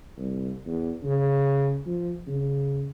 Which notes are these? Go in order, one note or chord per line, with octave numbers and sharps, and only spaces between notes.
C2
E2
C#3
F3
C#3